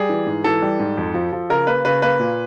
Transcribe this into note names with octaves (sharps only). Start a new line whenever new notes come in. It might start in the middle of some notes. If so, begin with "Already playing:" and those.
Already playing: G3 G#4
E3
G#2
E3 A4
G3
G#2
F2
F3
F3
C#3 A#4
A#3 B4
C#3 B4
A#3 B4
A#2